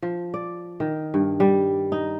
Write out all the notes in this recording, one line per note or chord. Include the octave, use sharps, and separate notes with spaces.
F3
D5
D#3
G2
G3
D#4